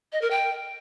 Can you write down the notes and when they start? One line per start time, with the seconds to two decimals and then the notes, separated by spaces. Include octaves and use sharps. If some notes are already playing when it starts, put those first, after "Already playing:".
0.13 D#5
0.22 A#4
0.31 G5